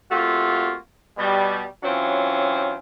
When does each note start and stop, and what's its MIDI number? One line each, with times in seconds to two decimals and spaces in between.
0.10 0.76 48
0.10 0.76 57
0.10 0.76 58
0.10 0.76 65
0.10 0.76 66
1.18 1.64 47
1.18 1.64 55
1.83 2.77 52
1.83 2.77 54
1.83 2.77 60
1.83 2.77 61
1.83 2.77 65